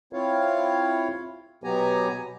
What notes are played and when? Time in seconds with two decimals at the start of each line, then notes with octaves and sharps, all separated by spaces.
0.13 C4 E4 F4 C#5 F5
1.64 B2 F#3 B3 G4 G#5 A#5